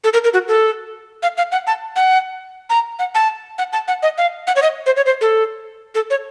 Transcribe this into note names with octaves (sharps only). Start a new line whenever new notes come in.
A4
A#4
A#4
F#4
A4
F5
F5
F#5
A5
F#5
A#5
F#5
A5
F#5
A5
F#5
D#5
F5
F#5
C#5
D#5
C5
C#5
C5
A4
A4
C#5